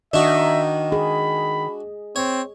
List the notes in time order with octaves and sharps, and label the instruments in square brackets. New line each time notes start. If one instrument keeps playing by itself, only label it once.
[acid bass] D#3 [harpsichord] D4 F#4 [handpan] D#5 [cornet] E5
[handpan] G#4 [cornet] B5
[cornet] C4 [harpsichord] C#5